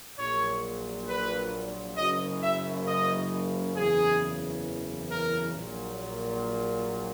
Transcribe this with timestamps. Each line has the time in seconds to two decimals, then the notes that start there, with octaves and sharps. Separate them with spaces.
0.18 A#1 A#2 F#3 C#5
1.08 B4
1.97 F#1 F#2 C#3 D#5
2.42 E5
2.87 D#5
3.76 F#1 E2 C#3 E3 G#4
5.10 A#4
5.54 A#1 A#2 F#3